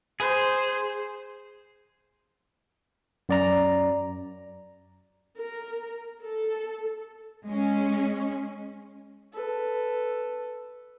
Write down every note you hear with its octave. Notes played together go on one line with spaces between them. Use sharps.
G#4 C5
F#2 D5 A#5
A#4
A4
G#3 C#4
A4 B4